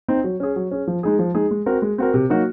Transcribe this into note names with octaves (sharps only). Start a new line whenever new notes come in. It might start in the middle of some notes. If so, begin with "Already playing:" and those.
C4 D#4
F#3
C#4 G#4
F#3
C#4 G#4
F3
G#3 D#4 G#4
F3
G#3 D#4 G#4
G#3
C4 F#4 A#4
G#3
C4 F#4 A#4
C3
F#3 A#3 D#4 F#4